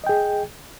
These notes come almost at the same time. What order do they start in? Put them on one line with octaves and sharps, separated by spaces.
D#5 G5 G#4